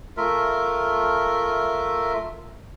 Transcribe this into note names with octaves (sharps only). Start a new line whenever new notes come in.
A3 F4 A#4 E5